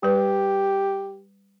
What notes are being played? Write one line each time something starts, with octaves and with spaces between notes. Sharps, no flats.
G3 G4 B4